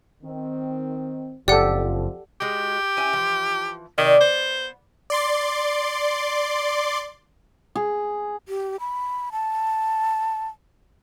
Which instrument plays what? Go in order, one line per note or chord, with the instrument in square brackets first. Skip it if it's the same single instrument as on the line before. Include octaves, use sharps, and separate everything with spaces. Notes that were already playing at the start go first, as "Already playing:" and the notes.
[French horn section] D#3 C4
[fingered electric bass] F#1 [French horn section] F2 F3 [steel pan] G4 A4 [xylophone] D5 F#5
[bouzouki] G#3 F#4 [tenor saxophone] G4
[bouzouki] C#4 E4 G#5
E3 F3
[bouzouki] C3 D5 [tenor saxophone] D#3
[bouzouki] B3 [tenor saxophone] C5
[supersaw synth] D5 C6 D6
[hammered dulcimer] G#4
[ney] G4
B5
A5